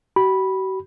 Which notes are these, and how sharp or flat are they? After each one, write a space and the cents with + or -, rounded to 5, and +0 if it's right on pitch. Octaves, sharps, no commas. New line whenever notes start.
F#4 +45 B5 -10